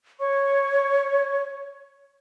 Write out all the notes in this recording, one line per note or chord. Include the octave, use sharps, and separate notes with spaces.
C#5 C#6